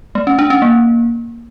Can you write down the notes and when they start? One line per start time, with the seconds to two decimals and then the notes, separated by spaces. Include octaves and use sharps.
0.15 A3
0.27 C#4
0.39 D4
0.50 C#4
0.62 A#3